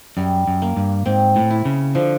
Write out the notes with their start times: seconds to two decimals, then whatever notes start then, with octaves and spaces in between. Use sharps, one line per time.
0.17 F#2 G3
0.48 F#2
0.62 A#3
0.77 G2
1.06 G#2 C4
1.36 A2
1.51 E4
1.65 C#3
1.95 D3 F3